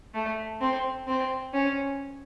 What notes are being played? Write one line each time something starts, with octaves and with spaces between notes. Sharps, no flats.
A3
C4
C4
C#4